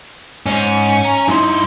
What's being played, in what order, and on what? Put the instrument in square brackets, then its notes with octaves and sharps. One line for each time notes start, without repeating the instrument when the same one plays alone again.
[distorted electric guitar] G#2 [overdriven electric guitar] C#4
[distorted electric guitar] A#5
[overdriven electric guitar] G2 C6 [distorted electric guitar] D#4 E4